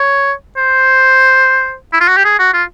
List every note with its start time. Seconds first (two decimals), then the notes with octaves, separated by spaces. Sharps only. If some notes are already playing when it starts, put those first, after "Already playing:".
Already playing: C#5
0.57 C5
1.93 E4
2.01 F4
2.08 F#4
2.17 G4
2.25 G#4
2.39 F#4
2.54 F4